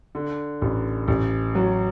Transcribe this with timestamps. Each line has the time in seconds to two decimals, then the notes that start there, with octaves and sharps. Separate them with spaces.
0.15 D3
0.62 A1
1.08 A1
1.55 F#3